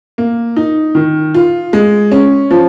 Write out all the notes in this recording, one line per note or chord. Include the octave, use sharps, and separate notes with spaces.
A#3
D#4
D#3
F4
G#3
C#4
F3